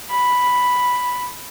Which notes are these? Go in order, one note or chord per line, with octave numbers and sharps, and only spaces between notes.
B5